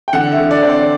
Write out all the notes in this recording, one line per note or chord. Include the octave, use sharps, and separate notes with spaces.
G5
D3 F#5
E5
D3
D5
C4
D5